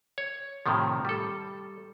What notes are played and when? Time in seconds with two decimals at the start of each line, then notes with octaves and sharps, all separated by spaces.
0.18 C#5
0.66 A2 C3 D#3 F3
1.05 G3 A4